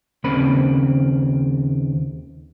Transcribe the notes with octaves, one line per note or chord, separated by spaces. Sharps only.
D#2 C#3 A#3 C4 B5